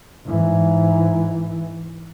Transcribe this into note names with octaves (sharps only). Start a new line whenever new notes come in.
G#2 E3